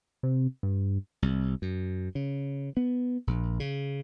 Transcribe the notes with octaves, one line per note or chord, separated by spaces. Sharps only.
C3
G2
C2
F#2
C#3
B3
A#1
C#3